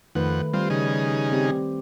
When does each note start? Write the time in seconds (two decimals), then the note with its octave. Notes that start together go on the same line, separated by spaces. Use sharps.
0.15 F2 D#3 A3 B4 F#5
0.54 G3 C4 F4
0.70 C#3 D#4 G#4
1.33 C4 G4